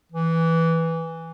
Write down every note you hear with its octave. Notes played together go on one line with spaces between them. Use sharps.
E3